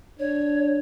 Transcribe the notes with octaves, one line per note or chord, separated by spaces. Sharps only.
D4 C#5